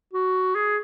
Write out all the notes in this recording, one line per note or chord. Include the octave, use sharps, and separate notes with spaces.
F#4
G#4